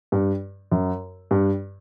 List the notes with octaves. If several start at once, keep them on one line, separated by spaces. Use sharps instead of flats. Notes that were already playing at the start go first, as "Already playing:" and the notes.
G2
F#2
G2